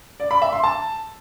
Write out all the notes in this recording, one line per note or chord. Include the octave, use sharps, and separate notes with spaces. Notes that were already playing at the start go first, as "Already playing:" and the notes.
D5
B5
E5
C6
A5